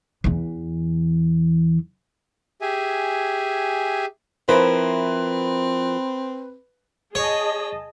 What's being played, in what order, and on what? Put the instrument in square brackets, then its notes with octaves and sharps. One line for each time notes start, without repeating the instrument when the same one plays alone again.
[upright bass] E2 E3
[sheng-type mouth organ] G4 G#4 E5 G#5
[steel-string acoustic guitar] F3 E4 A#4 [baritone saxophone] C4 [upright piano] B4
[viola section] G#4 D#5 A5 [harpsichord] C#5